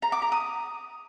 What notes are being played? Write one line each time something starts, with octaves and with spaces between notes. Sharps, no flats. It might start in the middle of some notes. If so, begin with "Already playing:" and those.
A#5
D6
A#5
D#6